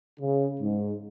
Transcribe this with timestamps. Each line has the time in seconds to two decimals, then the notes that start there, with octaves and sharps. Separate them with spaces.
0.19 C#3
0.60 G#2